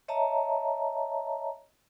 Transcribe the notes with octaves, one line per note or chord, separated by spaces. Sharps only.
C#5 D#5 E5 A5 A#5